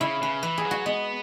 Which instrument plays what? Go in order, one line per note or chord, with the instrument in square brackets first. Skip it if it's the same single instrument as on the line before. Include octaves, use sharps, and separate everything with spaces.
[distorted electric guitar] C#3 [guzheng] E4
[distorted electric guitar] C#3 [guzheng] B4
[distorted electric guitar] E3 [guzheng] B4
[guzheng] G#4
[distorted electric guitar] F#3
[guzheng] F#4
[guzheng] G#3 [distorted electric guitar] B3